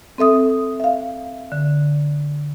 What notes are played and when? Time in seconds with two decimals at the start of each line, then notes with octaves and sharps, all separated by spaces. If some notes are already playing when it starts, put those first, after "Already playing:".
0.18 C4 A4 E5 D#6
0.80 E5 F5
1.52 D3